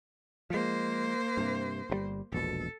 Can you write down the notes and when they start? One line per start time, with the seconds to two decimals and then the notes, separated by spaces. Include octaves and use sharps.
0.50 F3 G#3 A#3 C5
1.37 G2 C3
1.90 G1 C3 G3
2.32 E1 A#1 B2 A4